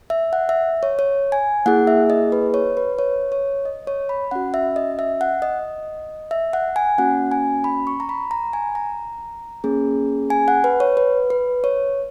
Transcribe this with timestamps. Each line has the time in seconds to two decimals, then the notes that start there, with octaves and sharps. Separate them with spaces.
0.10 E5
0.33 F#5
0.49 E5
0.83 C#5
0.99 C#5
1.32 G#5
1.66 A#3 E4 G#4 F#5
1.87 E5
2.10 D#5
2.32 B4
2.54 C#5
2.77 B4
2.99 C#5
3.32 C#5
3.65 D#5
3.87 C#5
4.09 B5
4.31 C#4 F#4 F#5
4.54 E5
4.76 D#5
4.99 E5
5.21 F#5
5.42 D#5
6.31 E5
6.53 F#5
6.76 G#5
6.98 A#3 C#4 F#4 F#5
7.32 G#5
7.64 B5
7.87 C#6
8.00 A#5
8.09 B5
8.31 A#5
8.53 G#5
8.75 A#5
9.64 A#3 C#4 G#4
10.30 G#5
10.48 F#5
10.64 B4
10.80 C#5
10.97 B4
11.30 B4
11.64 C#5